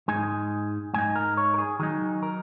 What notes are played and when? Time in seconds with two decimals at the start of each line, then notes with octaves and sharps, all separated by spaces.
0.08 G#2 G#3 D#4 G#5
0.94 G#2 G#3 D#4 G#5
1.16 A#4
1.37 C#5
1.54 A#4
1.58 G#4
1.79 D#3 F#3 D#4 G#4
2.23 A#4